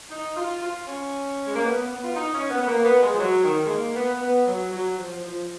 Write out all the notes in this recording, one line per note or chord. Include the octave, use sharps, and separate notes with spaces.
D#4
F4
F4
C#4
G#3
A#3
B3
B3
F4
D#4
C#4
B3
B3
A#3
B3
G#3
F3
F#3
D#3
G#3
A#3
B3
B3
F#3
F#3
F3
F3